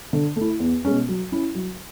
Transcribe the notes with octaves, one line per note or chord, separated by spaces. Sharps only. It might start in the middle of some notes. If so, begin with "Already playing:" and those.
D3
A3
E4
E2
B2 G#3 C#4
F#3
C#4 E4
F#3